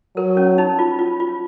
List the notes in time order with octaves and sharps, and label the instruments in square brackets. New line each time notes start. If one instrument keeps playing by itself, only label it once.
[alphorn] F#3 [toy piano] A#4
[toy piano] C#4
D#4
F4
F4
F4